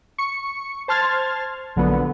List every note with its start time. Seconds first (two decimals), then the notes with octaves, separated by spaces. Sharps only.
0.18 C#6 C#7
0.88 C5 A5 C6 F6 G#6 A6
1.76 A#1 D3 F#3 B3